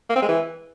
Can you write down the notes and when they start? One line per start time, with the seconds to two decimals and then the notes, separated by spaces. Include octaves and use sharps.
0.09 A#3
0.16 C4
0.22 G#3
0.28 E3